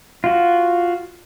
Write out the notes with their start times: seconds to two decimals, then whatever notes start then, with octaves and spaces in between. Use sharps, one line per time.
0.24 F4 F#4